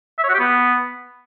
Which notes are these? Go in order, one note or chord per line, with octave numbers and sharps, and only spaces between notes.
E5
C#5
F#4
G4
B3